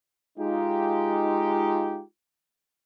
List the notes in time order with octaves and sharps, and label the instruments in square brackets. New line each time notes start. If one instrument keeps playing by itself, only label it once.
[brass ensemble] G#3 D#4 F4 G4